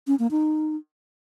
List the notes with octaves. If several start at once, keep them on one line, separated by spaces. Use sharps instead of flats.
C#4
A#3
D#4